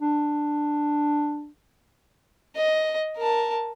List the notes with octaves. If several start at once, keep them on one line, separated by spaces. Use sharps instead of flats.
D4
D#5
A#4 A5